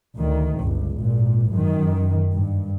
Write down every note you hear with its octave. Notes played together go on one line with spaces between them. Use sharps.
D2 D#3
G1 C#2
G#1 A#2
F#2 D#3
G2